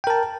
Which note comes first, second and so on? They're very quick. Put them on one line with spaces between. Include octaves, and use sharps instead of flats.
G5 A#4 A5